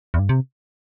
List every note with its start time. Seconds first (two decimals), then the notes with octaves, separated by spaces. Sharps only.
0.14 E2
0.19 G2
0.29 C3